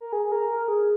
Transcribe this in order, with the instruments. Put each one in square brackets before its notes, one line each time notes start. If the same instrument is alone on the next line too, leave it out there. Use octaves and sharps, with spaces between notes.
[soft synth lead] A#4
G#4
G#4
A#4
A#4
G#4